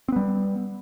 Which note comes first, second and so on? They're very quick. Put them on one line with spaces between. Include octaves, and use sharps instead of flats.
C4 B3 G3